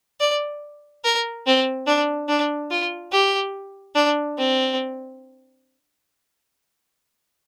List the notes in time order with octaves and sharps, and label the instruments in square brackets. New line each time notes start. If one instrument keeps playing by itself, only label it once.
[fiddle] D5
A#4
C4
D4
D4
F4
G4
D4
C4